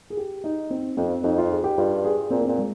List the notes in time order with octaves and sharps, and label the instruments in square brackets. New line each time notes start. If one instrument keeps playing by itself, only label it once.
[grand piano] G#4
G4
D#4
C4
[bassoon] F2 [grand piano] C4
[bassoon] F2 [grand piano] D#4
[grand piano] F4
G#4
G4
[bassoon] G2 [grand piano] F4
[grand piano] G#4
[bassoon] A#2 [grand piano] C4
[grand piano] A#3
[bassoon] A#2 [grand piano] C4
[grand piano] G#3